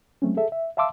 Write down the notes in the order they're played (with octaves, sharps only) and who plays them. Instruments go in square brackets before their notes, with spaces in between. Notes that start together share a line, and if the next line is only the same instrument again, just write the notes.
[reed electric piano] F#3 G#3 A3 C4 C#4
G#4 A4 E5
E5
E5 F5 A5 C6 D6 E6